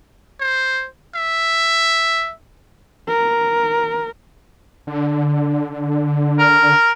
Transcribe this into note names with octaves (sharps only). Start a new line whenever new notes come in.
C5
E5
A#4
D3
A#4